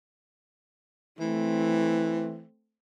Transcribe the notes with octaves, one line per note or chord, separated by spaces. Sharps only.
E3 A3 C4